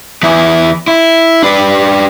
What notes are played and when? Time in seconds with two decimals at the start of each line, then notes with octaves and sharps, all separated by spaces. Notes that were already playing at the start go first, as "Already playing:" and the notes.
0.23 E2 E4
0.88 E4
1.43 D4 B4